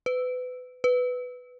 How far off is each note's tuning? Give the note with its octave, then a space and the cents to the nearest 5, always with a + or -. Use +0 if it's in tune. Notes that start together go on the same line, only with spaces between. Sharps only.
B4 +30
B4 +10